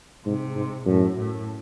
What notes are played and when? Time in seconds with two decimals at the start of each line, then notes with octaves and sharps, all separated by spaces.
0.26 G#2 C3
0.55 G#2
0.86 F#2 A2
1.16 A2